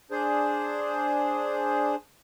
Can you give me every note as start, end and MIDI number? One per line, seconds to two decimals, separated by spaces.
0.11 1.95 62
0.11 1.95 68
0.11 1.95 72